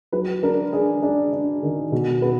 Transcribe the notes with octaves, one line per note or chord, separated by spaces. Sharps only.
F#3 B4
D4 A#4
D4 G#4
D4
D4
D#3
B2
B3